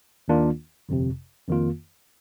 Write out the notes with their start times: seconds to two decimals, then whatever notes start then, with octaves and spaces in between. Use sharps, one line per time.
0.28 D#2 D#3 A#3 D4 F4
0.89 G1 F2 C3
1.48 F2 D#3 A#3 F4